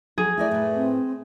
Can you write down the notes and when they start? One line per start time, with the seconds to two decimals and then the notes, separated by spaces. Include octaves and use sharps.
0.18 F#3 G#4
0.38 A3 E4 A#4 D5
0.51 A2 B4
0.75 C4